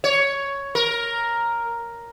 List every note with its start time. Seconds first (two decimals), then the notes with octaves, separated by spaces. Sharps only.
0.04 C#5
0.75 A#4